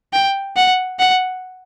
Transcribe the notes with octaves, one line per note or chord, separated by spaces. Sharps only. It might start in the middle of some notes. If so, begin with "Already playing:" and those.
G5
F#5
F#5